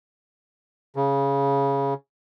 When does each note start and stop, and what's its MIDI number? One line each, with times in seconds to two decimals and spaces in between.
0.96 1.94 49